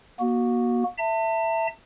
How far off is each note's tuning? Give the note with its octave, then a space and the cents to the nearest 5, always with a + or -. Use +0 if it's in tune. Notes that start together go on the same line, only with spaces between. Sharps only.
A#3 +40 F#4 +0
E5 +0 A5 +40